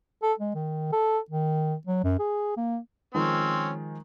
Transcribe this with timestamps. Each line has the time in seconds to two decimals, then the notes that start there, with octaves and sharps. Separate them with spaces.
0.22 A4
0.40 G#3
0.55 D#3
0.93 A4
1.30 D#3
1.87 F#3
2.04 F#2
2.19 G#4
2.57 A#3
3.15 D#3 F3 G#3 C4 C#4